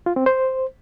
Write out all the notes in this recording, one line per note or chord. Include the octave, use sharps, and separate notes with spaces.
F4
C4
C5